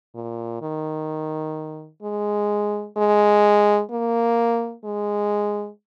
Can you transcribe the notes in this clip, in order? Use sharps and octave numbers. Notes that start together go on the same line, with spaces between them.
A#2
D#3
G#3
G#3
A#3
G#3